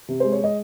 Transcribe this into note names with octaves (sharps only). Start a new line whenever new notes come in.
C3
G#3 C5
C#5
G#3 D#5